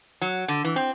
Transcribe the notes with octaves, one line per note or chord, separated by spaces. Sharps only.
F#3
D3
E3
C4